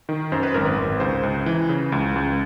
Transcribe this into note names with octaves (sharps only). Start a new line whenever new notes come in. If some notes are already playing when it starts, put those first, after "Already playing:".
D#3
F#2 C5
B4
G#1 A#4
B4
G#1
C#2 C5
C#2
E3
C#3
C#2
C#2